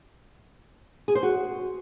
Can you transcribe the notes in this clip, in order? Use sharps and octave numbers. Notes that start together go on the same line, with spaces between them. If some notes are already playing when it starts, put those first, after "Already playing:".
G#4
C5
F#4